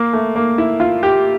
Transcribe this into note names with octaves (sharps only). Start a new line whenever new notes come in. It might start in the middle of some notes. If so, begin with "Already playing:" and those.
Already playing: A#3
A3
A#3
E4
F4
G4